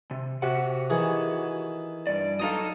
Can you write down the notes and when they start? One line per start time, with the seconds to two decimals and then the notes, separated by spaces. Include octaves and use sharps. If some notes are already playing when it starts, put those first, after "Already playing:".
0.11 C3
0.42 C3 F#4 G4 F#5
0.90 D#3 E3 G#4
2.07 G2 D5
2.39 F#3 D#4 A4 F5 A#5 D#6